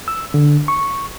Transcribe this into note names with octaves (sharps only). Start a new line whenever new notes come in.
E6
D3
C#6